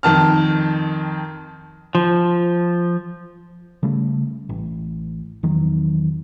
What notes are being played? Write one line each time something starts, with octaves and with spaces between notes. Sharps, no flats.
F2 D#3 A5 F6
F3
C#3 G3 A3
A1
E2 D#3 F#3